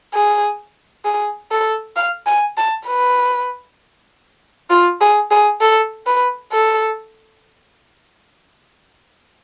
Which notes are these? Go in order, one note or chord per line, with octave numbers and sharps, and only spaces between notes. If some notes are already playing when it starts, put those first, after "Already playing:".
G#4
G#4
A4
F5
G#5
A5
B4
F4
G#4
G#4
A4
B4
A4